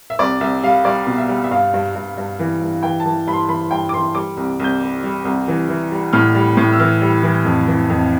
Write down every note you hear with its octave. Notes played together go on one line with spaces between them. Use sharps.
E5
C2 D5
C2 E5
G3 F5
G3 D5
B2
E5
G3
E5
G2 F5
G2
G2
G2
E3
G2
E3 G5
A5
E3
G2 B5
C6
E3 B5
G2 G5
D6
E3 C6
G3 D6
C2
C2 G6
G3
G3
C2
E3
E3
G3
A2 F6
G3
A2
E6
E3 F6
G3
E3
F2
E3
F2